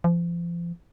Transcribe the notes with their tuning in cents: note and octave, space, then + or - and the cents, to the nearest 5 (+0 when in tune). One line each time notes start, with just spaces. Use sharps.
F3 -35